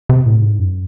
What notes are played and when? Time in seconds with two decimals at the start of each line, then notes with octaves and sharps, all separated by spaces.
0.09 C3
0.26 A2
0.41 G#2
0.59 F#2